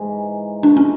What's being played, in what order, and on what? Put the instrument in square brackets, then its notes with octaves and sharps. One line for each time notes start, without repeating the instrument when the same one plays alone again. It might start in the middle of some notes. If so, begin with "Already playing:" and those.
Already playing: [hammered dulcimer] G#2 E3 G#3
[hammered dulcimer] F3 A#3 D#4 F#4 [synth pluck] D4
[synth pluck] C#4